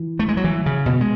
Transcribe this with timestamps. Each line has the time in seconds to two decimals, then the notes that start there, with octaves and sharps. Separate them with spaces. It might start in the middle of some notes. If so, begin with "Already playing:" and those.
Already playing: E3
0.19 A3
0.29 G#3
0.37 F#3
0.44 E3
0.66 C#3
0.86 B2
1.01 G#3